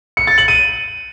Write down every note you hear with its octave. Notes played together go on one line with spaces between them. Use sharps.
C#7
A6
F#7
D#7